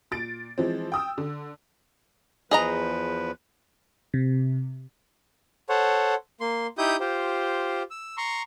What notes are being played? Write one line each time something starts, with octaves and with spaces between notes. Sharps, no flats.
A#2 A6 D7
E3 F3 G#3 C4
G5 D#6 E6
D3
E2 F3 G#4 B4 D#5 A#5
C3
A4 C5 C#5 F#5
A#3 C6
D#4 E4 G4 D#6 G6
F4 G4 C5
E6
A#5 C6 C#6